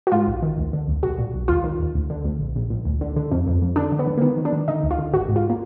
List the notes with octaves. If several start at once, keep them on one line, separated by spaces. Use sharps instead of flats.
F#4
G#2 F4
A#1
D#3
D2
D3
D2
B1 F#4
A#2
B1
D#2 F4
D#3
D#2
D2
D3
D2
A#1
A#1
A#1
D2
D3
D3
F2
F2
F2
D3 D4
D3
B3
D3
A#3
D#3 B3
D#3
D4
D#3
D3 D#4
D2
F4
D3
G#1 F#4
G#2
F4
A#3